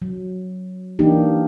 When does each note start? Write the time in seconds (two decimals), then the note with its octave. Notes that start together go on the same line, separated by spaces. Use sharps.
0.02 F#3
0.99 E3 A#3 D4 D#4 G4